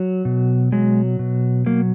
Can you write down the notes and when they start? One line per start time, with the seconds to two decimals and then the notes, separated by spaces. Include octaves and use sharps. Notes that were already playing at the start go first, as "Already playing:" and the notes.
Already playing: F#3
0.25 B2
0.72 F#3 G#3
1.19 B2
1.66 F#3 A#3